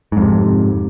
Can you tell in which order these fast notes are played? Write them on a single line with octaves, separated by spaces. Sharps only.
G#2 F2 C3